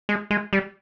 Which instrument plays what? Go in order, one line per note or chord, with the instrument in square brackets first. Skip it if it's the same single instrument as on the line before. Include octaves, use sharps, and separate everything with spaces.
[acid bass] G#3
G#3
G3